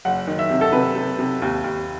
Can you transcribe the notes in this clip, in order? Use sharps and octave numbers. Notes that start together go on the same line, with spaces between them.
F#1 F#5
D#3
E5
C3
A4
C3 B4
C3
C3
D#2
D#2